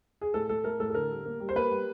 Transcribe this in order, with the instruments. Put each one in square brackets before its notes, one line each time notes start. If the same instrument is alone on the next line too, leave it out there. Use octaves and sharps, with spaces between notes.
[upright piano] G#4
A2 A4
A2 A4
A3 A#4
A2 A4
A4
D3 A#4
G3
A#3
G3
C5
A#3 B4
G3